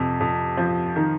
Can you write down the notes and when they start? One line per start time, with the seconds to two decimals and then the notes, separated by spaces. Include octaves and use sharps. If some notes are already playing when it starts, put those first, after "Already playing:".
Already playing: F2 C3
0.21 F2
0.57 F3
0.96 D#3